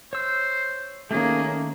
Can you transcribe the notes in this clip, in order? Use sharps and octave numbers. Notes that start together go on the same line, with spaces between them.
C5 C#5 E6
D#3 A3 A#3 C#4 G#4